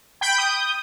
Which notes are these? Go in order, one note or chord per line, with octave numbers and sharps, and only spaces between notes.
G5 B5 G6 D7
D#6 G6